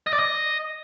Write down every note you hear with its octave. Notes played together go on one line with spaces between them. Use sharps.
D#5
D5
D#5